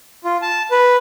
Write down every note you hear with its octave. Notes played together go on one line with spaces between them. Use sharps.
F4
A5
B4